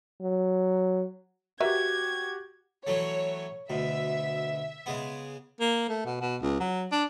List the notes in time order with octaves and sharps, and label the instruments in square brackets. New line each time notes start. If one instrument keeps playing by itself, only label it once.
[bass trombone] F#3
[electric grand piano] F#4 G4 [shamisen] A#4 B4 E5 [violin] G#6
[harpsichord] E3 F#3 A3 [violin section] C#5
[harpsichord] D2 B2 [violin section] E5
[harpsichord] C#3 G#3 B3
[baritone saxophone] A#3
A3
B2
B2
C#2
F#3
D4